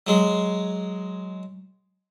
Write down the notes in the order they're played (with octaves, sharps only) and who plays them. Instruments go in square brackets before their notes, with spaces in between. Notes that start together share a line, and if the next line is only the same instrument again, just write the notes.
[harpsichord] F#3 G#3